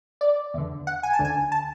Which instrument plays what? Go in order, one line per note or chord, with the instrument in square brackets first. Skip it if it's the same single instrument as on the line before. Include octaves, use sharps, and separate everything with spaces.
[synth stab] D5
E2 D3
F#5
G#5
A5
D2 D3
G#5
A5